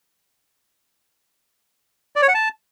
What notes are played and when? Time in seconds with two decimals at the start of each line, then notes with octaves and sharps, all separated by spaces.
2.16 D5
2.22 C#5
2.28 F#5
2.35 A5